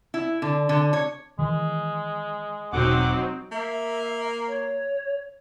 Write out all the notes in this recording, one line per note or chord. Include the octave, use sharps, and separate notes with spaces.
E4
D3
D3
C#5
D#3 E3 G#3
E1 B2 F#3 C4 D#4 F#5 D6
A#3 E5
C#5